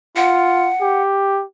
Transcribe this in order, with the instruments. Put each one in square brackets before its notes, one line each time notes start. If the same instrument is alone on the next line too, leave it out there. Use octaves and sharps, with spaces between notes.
[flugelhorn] F4 [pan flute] F#5
[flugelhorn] G4